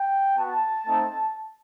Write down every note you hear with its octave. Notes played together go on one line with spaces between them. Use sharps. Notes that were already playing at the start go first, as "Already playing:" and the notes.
Already playing: G5
B3 F#4 A5
A3 C4 D#4